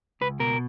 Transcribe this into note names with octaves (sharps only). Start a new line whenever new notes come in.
C#2 B4
B2 A#4